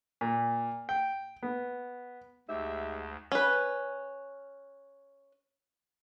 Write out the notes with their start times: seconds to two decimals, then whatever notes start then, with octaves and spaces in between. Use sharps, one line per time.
0.21 A#2
0.89 G5
1.43 B3
2.49 D2 G#2 G4 E5
3.32 C#4 B4